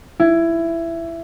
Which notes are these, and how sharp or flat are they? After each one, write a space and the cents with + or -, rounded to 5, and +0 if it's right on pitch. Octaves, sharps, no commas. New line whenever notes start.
E4 +15